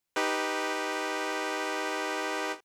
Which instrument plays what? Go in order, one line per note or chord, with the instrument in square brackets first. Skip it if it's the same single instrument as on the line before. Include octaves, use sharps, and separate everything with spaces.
[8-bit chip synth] D#4 G4 B4